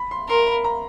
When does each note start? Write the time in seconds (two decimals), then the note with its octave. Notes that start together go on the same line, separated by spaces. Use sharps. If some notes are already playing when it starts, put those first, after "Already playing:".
Already playing: B5
0.11 C6
0.28 A#4 C6
0.47 B5
0.64 A#5